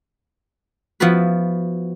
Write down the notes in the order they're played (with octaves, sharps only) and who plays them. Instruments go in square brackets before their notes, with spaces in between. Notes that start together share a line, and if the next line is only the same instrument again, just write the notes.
[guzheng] F3 B3 E4 F#4 B4